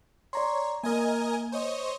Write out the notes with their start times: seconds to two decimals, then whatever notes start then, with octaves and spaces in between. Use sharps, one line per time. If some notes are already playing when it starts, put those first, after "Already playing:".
0.33 C#5 D5 A#5 C6
0.83 A#3 A#4 D#5 G#5
1.52 C5 C#5 D#5